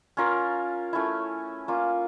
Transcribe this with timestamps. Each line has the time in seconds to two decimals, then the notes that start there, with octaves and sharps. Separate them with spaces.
0.17 C#4 F4 A#4
0.93 A3 C#4 E4
1.68 A#3 C#4 F4